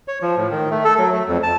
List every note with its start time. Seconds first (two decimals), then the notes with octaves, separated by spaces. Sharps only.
0.08 C#5
0.22 F3
0.37 A2
0.51 D#3
0.71 A3
0.85 A4
0.99 F#3
1.13 A3
1.28 F2
1.43 A5